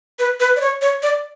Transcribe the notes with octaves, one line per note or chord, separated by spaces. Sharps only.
B4
B4
D5
C#5
C#5
D5